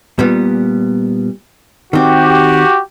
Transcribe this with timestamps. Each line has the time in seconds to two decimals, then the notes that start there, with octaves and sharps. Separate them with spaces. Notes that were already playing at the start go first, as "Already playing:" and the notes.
0.19 A#2 G3 B3
1.93 D#3 C4 F#4 G4